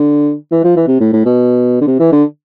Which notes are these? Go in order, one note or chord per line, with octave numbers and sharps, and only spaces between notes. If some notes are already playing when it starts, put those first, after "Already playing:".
Already playing: D3
E3
F3
E3
C3
A2
A2
B2
D3
C3
E3
D3